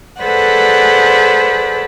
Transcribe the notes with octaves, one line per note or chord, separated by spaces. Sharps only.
G#4 A4 B4 C5 D5 F#5